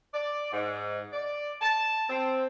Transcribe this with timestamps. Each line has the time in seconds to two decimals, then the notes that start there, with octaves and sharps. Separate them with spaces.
0.14 D5
0.52 G#2
1.13 D5
1.61 A5
2.09 C4